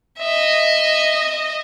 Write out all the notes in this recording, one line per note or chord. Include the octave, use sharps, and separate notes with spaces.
D#5 E5